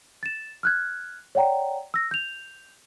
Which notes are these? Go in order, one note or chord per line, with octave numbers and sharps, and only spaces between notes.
A6 E7
F6 F#6 G#6
C#5 D5 F#5 G5 A#5
E6 A#6
G6 F7